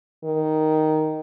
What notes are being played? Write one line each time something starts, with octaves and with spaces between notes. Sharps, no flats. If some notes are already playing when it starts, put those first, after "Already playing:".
D#3